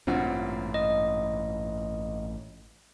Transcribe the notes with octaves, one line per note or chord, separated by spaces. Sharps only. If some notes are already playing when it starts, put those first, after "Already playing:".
A1 G2 A#2 C4 F4 F#4
D#5 D#6